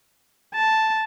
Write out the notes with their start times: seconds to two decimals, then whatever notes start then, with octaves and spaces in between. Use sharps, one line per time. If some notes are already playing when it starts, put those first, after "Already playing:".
0.54 A5